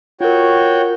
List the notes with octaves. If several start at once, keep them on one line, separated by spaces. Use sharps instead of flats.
F4 F#4 A#4 C#5 G5